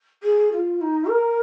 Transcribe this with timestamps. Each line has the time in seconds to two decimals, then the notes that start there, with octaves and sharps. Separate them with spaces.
0.23 G#4
0.52 F4
0.81 D#4
1.09 A#4